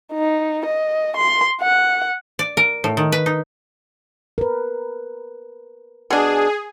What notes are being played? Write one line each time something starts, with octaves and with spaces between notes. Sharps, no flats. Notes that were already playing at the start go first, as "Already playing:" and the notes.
D#4
D#5
C6
F#5
D5
A#4
A2
D#3
B4
D#4
A#4 B4
B2 D4 G#4